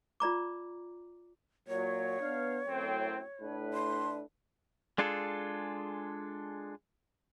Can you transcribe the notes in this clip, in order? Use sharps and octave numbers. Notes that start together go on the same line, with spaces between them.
F4 D5 A#5 D6
A#2 F#3 C#5
B3 D4 F5
F#2 A2 C4
A2 D4 B4
C6
G#3 D4 F4 G#4 A4